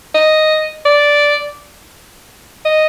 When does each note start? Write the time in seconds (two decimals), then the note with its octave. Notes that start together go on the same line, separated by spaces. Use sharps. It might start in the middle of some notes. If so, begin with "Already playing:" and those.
0.15 D#5
0.85 D5
2.65 D#5